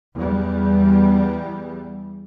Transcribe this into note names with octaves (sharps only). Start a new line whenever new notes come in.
E2 G3